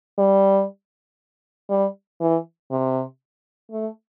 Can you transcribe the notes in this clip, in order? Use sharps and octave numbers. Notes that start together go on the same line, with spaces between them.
G3
G3
E3
C3
A3